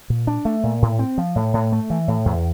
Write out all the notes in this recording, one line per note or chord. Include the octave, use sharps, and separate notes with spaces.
A#2
D4
A3
A#2
A2
C4
F3
A2
A2
A3
E3
A2
E2